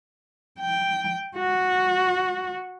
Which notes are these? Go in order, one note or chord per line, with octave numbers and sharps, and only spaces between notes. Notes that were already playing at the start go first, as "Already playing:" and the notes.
G5
F#4